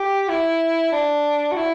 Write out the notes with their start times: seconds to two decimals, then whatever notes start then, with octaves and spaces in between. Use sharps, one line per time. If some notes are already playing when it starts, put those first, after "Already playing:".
Already playing: G4
0.29 E4
0.92 D4
1.52 F#4
1.57 E4